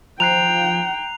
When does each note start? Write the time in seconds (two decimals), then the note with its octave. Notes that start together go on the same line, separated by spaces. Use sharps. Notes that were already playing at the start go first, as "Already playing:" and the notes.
0.20 F3 G5 A#5 F#6 C7 F7